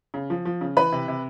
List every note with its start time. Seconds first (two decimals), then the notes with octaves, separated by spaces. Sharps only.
0.14 C#3
0.30 F3
0.45 F3
0.61 C#3
0.77 E3 B4 B5
0.92 C3
1.08 C3